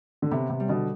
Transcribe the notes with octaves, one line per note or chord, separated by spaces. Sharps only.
D3
C3 B3
C3
G3
B2 D3